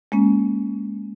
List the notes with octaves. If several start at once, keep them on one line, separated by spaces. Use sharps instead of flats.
G#3 A#3 C#4